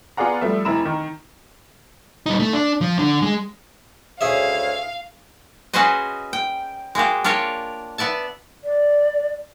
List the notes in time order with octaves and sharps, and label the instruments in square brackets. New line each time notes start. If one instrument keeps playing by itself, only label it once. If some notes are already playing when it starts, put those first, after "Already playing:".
[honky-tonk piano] B3 F4 G#4 D5 F#5 A#5
F3 G3 A3 E5
F1 E4 A#5 B5 E7
D#3
[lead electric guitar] G3 D#4
A3
D4
F3
D3
G#3
[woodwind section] D2 C#3 C#5 [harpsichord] G#4 E5 [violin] F5
[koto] C#4 F#4 G#4 B4 C5 D#5
G5
G#3 A#3 F#4 G4
D4 F4 A#4 C#5 F5 G5
B3 D5 E5 A5
[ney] D5